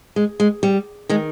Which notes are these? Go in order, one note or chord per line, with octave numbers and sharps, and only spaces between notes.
G#3
G#3
G3
D#3 G#3